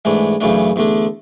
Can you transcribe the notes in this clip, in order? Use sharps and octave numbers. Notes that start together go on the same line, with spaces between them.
G#2 E3 A3 D4
F#2 C#3 E3 A3 D4
E2 D3 A3 D4